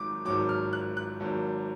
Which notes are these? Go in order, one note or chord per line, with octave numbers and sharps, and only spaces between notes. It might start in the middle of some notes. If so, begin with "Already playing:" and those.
Already playing: G#1 G#2 F#3 D6
G#1 G#2 F#3 D6
F6
F#6
F#6
G#1 G#2 F#3